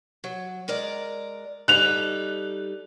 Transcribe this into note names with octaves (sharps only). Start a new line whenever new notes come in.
F#3
G#3 A#4 D5
G3 D#4 A4 F#6 F7